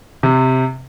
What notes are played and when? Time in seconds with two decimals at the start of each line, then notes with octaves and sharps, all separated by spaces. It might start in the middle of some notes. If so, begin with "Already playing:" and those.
0.23 C3